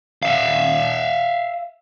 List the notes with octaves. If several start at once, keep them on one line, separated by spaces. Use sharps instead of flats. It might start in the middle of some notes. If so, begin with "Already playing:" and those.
E5 F5